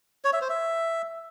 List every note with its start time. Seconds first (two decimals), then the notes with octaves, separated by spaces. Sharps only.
0.24 C#5
0.33 E5
0.41 C5
0.50 E5